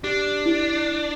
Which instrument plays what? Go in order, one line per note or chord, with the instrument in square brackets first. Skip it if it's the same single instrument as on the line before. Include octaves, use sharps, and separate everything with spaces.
[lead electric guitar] D4 [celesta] G4
[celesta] E4